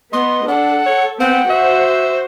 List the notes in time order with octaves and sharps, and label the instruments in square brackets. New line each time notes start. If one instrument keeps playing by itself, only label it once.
[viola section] B3 [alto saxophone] D#5 [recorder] C6
[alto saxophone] D4 [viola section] A4 [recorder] F#5
[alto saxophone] C#5
[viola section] B3 G5 [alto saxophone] C4 [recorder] F#5
[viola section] F#4 C5 [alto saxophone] E5